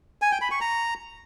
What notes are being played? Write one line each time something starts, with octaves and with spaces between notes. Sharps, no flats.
G#5
G5
B5
C#6
A#5